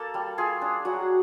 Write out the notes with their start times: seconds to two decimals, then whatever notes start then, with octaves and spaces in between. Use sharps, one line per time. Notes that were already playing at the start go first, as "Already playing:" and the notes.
Already playing: A#3 A4 A5
0.14 G3
0.38 F4 G#4 G#5
0.62 D4
0.85 F#3 F#4 F#5